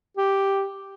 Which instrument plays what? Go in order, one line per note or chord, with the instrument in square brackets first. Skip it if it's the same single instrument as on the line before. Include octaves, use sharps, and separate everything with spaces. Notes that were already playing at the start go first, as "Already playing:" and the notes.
[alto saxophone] G4